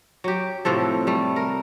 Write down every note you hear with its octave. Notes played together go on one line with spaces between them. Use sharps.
F#3 G4
A2 C3 F3 A4
G3 A3
A#4